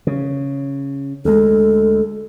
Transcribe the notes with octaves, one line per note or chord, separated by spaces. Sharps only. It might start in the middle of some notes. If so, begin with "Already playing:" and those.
C#3
D2 G#3 A4